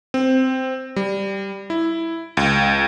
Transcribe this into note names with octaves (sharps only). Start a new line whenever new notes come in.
C4
G3
E4
C#2